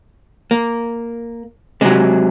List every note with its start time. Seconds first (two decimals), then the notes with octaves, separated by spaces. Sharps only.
0.51 A#3
1.81 C3 F#3 G#3